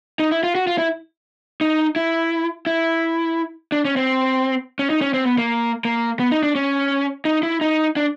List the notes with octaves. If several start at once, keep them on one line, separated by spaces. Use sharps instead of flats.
D#4
E4
F4
F#4
F4
E4
D#4
E4
E4
D4
C#4
C4
C#4
D#4
C#4
C4
B3
A#3
A#3
B3
D#4
D4
C#4
D#4
E4
D#4
D4